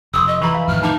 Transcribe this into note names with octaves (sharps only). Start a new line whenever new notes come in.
F1 C6 C#6 D#6 E6
D#5
E3 A#5 B5 C#6
F5
F2 A2 D#3 F6
D#4 A5 D6